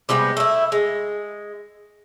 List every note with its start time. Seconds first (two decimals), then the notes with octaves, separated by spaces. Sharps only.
0.09 C3 G3 G#3 B3
0.37 A3 E4
0.72 G#3